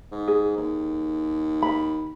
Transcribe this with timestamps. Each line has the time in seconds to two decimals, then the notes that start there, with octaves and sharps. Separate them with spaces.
0.11 G#2
0.28 G#4
0.57 D#2
1.63 B5